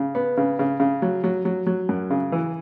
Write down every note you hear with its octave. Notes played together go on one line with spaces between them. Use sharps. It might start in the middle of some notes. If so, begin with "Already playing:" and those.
Already playing: C#3
B3
C#3
C#3
C#3
F#3
F#3
F#3
F#3
F#2
C#3
E3